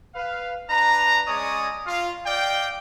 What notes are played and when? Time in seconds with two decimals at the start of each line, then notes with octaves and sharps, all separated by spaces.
0.15 B4 F5
0.69 D4 B4 A#5
1.27 G#3 C#4 C#5 D5 D#6
1.86 F4 F5
2.25 D5 D#5 F5 G5